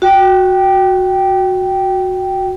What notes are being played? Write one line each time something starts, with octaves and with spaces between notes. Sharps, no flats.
F#4 G5